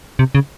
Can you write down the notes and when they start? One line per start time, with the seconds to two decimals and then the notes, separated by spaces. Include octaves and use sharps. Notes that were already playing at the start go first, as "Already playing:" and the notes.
0.19 C3
0.35 C#3